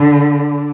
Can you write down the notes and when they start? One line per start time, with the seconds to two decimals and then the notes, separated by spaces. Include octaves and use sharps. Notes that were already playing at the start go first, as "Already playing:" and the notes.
Already playing: D3